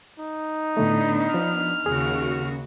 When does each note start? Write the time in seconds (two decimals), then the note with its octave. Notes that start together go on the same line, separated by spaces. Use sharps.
0.19 D#4
0.77 A2 D3 A3 B3 D4
1.34 F3 F6
1.86 D#2 C#3 F#4 G#4